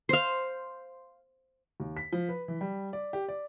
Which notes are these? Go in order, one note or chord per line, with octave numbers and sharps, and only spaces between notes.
C5 F5
D#2
B6
F3
B4
E3
G3
D5
G4
D5